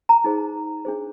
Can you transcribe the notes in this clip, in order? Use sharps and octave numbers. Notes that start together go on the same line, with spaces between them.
A#5
D#4 G#4 C5
D4 G#4 C5